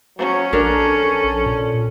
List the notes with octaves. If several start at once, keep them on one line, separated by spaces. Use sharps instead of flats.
F#3 C#4
A#1 D4 A4 A#4
A#2